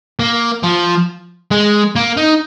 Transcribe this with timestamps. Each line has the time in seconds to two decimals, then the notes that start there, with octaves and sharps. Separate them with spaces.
0.20 A#3
0.63 F3
1.51 G#3
1.96 A#3
2.17 D#4